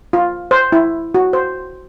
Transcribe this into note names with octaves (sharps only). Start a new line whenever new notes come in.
F4
C5
E4
F#4
C5